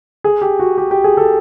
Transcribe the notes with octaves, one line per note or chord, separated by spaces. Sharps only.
G#4
G4
F#4
G4
G4
G#4
A4